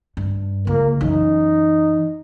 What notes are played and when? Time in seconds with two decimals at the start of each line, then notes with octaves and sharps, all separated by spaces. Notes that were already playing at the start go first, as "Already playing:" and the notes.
0.17 G2
0.67 C#2 A#3
1.01 F#2 E3 D#4